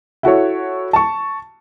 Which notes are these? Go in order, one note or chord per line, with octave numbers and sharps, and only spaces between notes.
E4 F#4 A4 C#5
A5 C#6